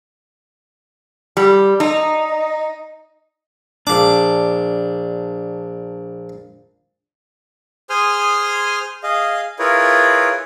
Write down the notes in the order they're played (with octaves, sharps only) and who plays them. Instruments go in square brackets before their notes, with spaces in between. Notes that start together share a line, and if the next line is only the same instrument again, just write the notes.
[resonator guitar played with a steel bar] G3
D#4
[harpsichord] A#1 D6 [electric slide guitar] D4
[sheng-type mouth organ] G#4 C5 G#5 C6 D#6 F6
G#4 D#5 F5
E4 F4 G#4 A#4 B4 C#5